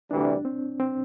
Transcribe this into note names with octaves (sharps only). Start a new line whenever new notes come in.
D2 C3 E3 G3 D4
C4
C4